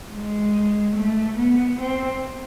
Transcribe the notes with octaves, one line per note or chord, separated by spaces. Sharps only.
G#3
A3
B3
C4